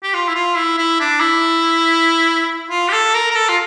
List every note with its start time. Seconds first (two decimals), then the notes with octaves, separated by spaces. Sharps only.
0.03 G4
0.14 F4
0.28 E4
0.35 F4
0.57 E4
0.78 E4
1.00 D4
1.20 E4
2.71 F4
2.89 G4
2.93 A4
3.14 A#4
3.31 A#4
3.35 A4
3.49 F4